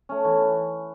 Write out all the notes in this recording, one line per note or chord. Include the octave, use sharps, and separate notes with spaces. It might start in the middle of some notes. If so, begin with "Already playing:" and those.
A3 C#4
E3